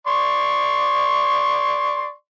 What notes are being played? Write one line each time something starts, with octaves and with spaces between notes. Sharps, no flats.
D5 C6 C#6